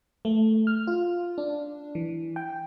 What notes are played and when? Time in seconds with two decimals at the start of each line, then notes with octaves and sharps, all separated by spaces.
0.25 A3
0.67 F6
0.87 F4
1.38 D4
1.95 E3
2.36 G5